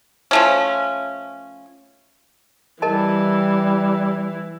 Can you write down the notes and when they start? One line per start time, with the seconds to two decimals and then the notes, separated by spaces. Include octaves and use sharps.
0.31 F3 A3 C#4
2.82 E3 G3 A#4 D#5 A5